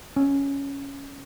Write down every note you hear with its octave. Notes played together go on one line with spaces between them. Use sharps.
C#4